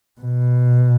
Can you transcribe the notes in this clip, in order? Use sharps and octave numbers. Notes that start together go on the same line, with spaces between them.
B2